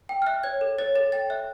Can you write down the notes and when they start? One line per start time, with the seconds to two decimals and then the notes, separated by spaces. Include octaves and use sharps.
0.09 G5
0.22 F6
0.26 E5 F#6
0.43 C#5 G#6
0.61 A4
0.78 C#5 A6
0.95 A4 A6
1.12 G5 A6
1.30 E5 F#6